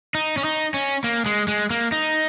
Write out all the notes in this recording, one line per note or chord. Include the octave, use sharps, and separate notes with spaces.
D#4
C#4
D#4
C#4
A#3
G#3
G#3
A#3
D#4